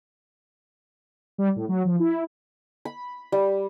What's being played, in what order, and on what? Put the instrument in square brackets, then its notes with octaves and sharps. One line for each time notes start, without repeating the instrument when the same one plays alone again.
[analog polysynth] G3
A2
F#3
F3
E4
[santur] B5
G3